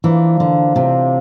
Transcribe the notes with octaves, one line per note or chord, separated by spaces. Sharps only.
E3 F3 A#3 D4
D3
A2 C3 F3 C4